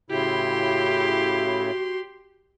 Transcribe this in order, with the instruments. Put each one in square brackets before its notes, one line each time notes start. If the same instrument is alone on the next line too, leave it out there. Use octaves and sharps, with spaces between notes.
[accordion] A2 C#3 E4 [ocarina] F#4 [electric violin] G4 C6